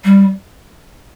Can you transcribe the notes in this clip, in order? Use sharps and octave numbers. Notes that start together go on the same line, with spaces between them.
G3